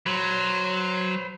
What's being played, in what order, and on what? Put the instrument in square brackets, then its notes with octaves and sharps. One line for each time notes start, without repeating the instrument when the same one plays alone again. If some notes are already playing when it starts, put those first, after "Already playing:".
[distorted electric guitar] F#3 [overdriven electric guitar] B4 C5